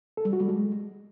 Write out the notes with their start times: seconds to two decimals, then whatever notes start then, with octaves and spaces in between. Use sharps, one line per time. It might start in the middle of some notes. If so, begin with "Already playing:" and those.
0.17 A4
0.25 G3
0.33 F#4
0.41 G3
0.48 G#3